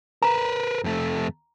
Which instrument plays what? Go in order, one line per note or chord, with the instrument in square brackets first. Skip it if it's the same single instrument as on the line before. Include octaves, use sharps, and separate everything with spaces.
[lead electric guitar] A#4 B4 [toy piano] A#5
[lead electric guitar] F2 A3